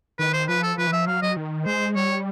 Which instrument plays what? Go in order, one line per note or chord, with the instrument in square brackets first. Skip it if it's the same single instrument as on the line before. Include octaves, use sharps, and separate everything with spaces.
[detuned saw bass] D#3 [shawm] B4
[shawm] C5
[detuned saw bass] F3 [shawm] B4
[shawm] A4
[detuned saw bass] F3 [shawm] B4
[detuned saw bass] E3
[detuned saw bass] F3 [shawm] E5
[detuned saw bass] F#3 [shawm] F5
[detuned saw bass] F#3 [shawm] D#5
[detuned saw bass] D#3
[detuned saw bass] G#3 [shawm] C5
[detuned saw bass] G3 [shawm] C#5